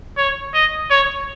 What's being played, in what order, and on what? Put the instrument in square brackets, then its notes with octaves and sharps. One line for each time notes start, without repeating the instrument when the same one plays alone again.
[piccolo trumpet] C#5
D#5
C#5